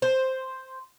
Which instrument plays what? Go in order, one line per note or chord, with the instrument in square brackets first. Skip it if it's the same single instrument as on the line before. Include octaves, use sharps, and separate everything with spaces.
[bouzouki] C5